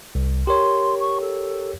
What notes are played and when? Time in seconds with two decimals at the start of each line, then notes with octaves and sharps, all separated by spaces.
0.15 C2
0.47 G4 A#4 C#5 C6
1.00 C#6
1.21 A4